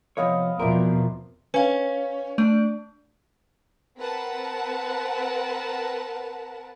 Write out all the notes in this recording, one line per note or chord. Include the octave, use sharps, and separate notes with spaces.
C3 F3 B3 C#5 D#5 F5
E2 B2 F3 C4 A#4 D5 E5
C#4 B4 F5
A3 D4
C4 A#4 B4 F#5 A5